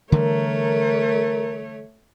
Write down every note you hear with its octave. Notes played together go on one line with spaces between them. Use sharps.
D3 E3 G3 A3 A#4 C#5